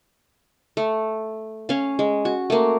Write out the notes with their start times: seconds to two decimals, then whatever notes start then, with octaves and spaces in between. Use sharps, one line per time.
0.77 A3
1.69 C#4 F5
1.99 G#3
2.25 F#4
2.50 A3 A#3